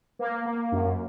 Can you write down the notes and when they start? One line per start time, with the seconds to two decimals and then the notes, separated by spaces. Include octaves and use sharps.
0.19 A#3
0.46 A#3
0.72 F#2